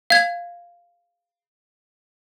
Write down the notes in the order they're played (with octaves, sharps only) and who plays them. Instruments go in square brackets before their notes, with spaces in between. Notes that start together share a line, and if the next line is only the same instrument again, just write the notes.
[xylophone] F5 G#6